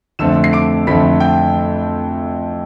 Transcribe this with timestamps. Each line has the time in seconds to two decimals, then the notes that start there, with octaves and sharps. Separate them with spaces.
0.19 F2 D3 A3 C4 E6 E7
0.44 C7
0.53 D6 D7
0.87 F2 D3 A3 C4 B5 B6
1.20 G5 G6